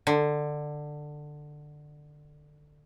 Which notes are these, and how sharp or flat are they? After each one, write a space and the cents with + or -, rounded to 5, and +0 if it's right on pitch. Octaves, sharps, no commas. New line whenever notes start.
D3 +15